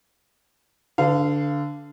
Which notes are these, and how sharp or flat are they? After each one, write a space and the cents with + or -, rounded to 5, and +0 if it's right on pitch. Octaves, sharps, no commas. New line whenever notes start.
D3 -5 B4 +30 F5 -15